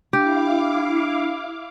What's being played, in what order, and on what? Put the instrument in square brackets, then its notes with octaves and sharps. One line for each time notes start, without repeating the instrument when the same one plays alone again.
[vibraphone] D4 [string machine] E4 F5 D6 [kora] G4